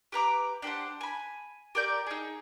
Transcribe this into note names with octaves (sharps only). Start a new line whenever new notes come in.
G4 B4 A#5 D6
D4 G4 C5 F#5
G#5 B5
G4 A#4 D5 G6
D#4 G#4